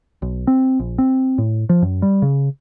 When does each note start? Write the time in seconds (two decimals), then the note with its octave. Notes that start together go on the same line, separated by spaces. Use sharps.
0.22 B1
0.47 C4
0.79 A#1
0.98 C4
1.38 A2
1.69 F3
1.82 F#2
2.02 G3
2.22 C#3